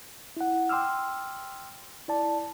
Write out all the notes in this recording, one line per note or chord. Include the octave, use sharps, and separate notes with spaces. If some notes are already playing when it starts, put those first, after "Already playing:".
E4 F#5
G5 C6 D6 E6 F6
E4 D5 A5